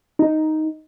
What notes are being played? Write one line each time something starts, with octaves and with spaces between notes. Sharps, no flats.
D#4